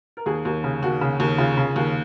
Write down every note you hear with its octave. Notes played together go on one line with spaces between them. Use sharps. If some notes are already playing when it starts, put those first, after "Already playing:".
A#4
D#2 G#4
D#2
C#3
D#2 F#4
C#3
D#2
C#3 F4
C#3
D#2